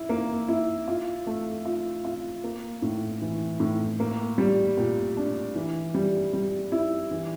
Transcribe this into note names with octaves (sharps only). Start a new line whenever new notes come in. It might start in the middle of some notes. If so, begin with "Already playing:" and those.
Already playing: E4
A#3
E4
F4
A3
F4
F4
A#3
A2
E3
A2
A#3
G3
A#2
D4
E3
G3
G3
E4
E3